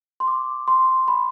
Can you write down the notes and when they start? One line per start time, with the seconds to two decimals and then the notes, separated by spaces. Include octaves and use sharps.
0.20 C6
0.28 D6
0.68 C6
1.08 B5